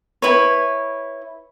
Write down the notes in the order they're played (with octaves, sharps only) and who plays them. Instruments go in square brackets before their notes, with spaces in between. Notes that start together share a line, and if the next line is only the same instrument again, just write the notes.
[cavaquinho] E4 B4 C#5